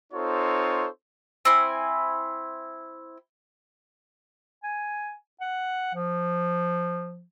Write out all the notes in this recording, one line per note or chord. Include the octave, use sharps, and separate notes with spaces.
C4 D#4 F4 A4 C5 C#5
C4 E4 G#5
G#5
F#5
F3